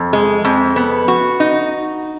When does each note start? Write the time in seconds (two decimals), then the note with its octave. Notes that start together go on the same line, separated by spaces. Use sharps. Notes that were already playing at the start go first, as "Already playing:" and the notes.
Already playing: F2
0.13 G#3
0.45 F2
0.76 B3
1.08 F#4
1.40 D#4